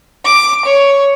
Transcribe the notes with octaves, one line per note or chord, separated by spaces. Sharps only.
D6
C#5